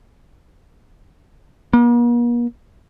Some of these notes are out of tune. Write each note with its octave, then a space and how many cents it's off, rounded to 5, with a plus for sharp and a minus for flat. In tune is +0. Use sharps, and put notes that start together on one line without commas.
A#3 +45